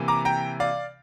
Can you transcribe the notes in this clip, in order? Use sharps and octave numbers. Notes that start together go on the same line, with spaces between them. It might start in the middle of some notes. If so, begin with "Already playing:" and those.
Already playing: C3 E3 A#3
A#5 D6
G5 A#5
D5 F5